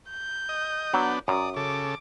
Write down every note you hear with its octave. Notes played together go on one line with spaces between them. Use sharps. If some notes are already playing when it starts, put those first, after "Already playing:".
G6
D#5
F#3 B3 D4
F#2 D5 D#6
C#3 A4 D6